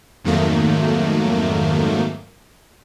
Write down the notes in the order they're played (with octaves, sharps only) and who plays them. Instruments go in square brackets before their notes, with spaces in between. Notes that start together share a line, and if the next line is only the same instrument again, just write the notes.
[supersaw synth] F2 G#2 D#3 F#3 A3 A#3